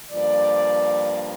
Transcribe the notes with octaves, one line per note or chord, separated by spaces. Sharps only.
G2 F3 A#3 D5